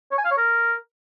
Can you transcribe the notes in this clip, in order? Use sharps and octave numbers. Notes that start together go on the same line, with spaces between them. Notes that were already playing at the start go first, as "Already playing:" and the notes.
C#5
G#5
F5
C#5
A#4